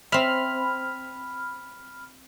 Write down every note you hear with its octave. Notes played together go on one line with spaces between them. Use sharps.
C4 E5 B5 F6